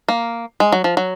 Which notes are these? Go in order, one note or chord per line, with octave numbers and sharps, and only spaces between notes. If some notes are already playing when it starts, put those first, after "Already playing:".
A#3
G#3
F#3
F3
F#3